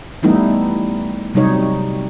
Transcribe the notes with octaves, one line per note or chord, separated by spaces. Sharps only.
E3 G3 A3 B3 D#4 E4
C3 F#3 G3 D#4 C#5